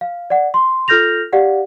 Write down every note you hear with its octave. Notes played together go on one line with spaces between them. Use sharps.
F5
D5 F#5
C6
F4 A4 F6 G6 A#6 F7
G4 D5 F5 F#5